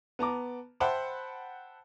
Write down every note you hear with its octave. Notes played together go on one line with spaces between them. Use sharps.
B3 A5 A#5 D6
C5 E5 F#5 G5 A5 B5